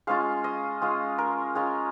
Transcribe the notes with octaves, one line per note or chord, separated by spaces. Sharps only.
G#3 C#4 F4 F5
D#5
G#3 C#4 F4
A#4
G#3 C#4 F4